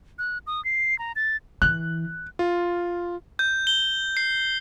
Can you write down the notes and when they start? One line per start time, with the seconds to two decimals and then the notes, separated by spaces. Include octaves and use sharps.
0.19 F#6
0.47 D#6
0.65 C7
0.99 A#5
1.16 A6
1.62 E3 F#6
2.39 F4
3.39 G6
3.67 G7
4.17 C7